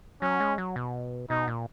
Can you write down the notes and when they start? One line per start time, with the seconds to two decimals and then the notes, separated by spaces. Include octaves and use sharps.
0.22 F#3 C#4
0.40 G#3
0.58 F#3
0.76 B2
1.30 B2 D#4
1.48 A#2